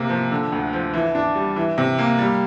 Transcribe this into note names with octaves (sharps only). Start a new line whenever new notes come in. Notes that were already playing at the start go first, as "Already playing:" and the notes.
Already playing: C3 A#3
F3
D3
D2
F3
E3
D4
G3
E3
C3
A#3
G3